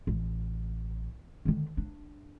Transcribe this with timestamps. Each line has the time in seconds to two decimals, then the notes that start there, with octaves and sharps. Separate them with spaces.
0.07 A1
1.45 D3 D#3
1.77 D4